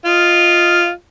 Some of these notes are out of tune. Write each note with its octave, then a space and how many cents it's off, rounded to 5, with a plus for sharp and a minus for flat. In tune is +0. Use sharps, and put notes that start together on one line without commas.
F4 +0 D#5 +10